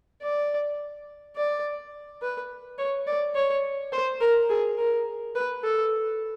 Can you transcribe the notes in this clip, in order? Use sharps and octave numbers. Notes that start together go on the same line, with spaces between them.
D5
D5
B4
C#5
D5
C#5
C5
A#4
G#4
A#4
B4
A4